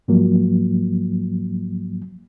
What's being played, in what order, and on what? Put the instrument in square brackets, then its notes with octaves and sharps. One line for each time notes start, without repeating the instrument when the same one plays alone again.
[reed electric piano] G#2 F3 F#3 A#3